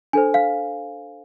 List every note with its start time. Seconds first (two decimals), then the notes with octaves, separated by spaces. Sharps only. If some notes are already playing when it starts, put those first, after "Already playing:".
0.13 D4 A4 C5 G#5
0.34 F5